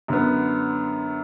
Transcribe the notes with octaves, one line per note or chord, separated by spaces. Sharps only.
F#2 D3 F#3 B3